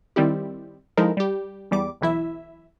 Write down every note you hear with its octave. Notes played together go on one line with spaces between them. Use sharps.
D#3 G3 C4 E4 G4
F3 G#3 D#4 E4 A4 A#4
G3 G4
E2 G3 D6
B1 E3 E4 E5